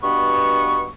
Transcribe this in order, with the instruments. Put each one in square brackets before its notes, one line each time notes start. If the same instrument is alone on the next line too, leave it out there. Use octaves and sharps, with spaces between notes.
[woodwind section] G2 B2 B3 C#6